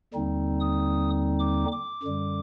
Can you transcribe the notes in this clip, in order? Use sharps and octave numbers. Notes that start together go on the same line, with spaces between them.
D#2 D3 G3 C4 D#4
D#6
D6
D6
F#2 D3 G3